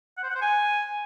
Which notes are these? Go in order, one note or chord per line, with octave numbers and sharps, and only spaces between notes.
F#5
C5
F#5
C5
G#5